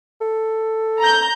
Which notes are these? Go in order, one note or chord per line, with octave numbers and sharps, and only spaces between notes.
A4
A#5 G6